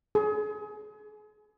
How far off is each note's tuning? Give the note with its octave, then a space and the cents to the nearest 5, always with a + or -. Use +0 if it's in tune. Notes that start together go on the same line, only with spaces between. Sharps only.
G#4 +35